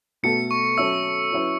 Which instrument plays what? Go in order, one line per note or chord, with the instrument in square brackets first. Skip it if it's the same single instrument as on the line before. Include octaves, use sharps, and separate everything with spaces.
[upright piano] B2 A3 F#4 A4 [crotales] C#7
[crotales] C#6
[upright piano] F#3 C#4 A4 E5 [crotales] E6
[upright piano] F#3 C#4 E4 B4